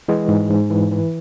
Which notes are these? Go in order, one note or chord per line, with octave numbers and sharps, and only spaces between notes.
E3 G#3
G#2
G#2
E3
E3